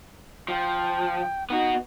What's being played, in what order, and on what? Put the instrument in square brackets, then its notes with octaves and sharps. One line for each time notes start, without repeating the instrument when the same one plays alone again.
[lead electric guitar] F3 [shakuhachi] G5
[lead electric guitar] B3 F#4 [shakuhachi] D#4